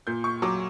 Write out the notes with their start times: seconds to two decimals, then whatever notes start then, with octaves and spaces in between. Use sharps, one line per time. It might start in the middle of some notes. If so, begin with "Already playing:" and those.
0.07 A#2 G6
0.24 C#6
0.42 F#3 D6